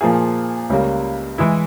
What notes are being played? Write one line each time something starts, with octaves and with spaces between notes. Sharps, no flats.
A#2 F3 A#3 F4 G#4
C#2 C#3 G3 A#3
E3 G#3 E4